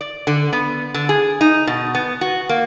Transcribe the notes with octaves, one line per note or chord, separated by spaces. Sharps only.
D5
D3
B3
D3
G#4
D#4
B2
B3
F#4
A#3